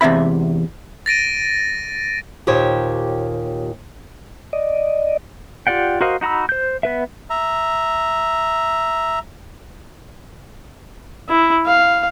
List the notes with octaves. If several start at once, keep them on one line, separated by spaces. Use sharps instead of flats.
E2 C3 E5 B5
A6 A#6 D7 D#7
D#2 A#2 G4 C5 C#5
D5 D#5
F4 G4 D5 F#5 G5
F#4 A#4 C5 D#5 F5
D#4 F#4 A#5 B5 E6
C5 G6
B3 B4 E5
E5 A#5
E4
F5